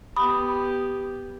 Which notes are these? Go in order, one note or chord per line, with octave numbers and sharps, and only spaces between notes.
B3 G4 B5 D#6